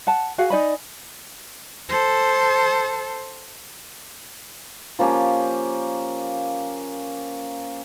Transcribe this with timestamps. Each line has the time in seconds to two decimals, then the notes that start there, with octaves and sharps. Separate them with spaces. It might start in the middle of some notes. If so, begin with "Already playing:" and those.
0.07 F#5 A5
0.38 F#4 G#4 F5 F#5
0.50 D#4 D5 G#5 B5
1.89 A4 C5
4.99 F3 A#3 C#4 G4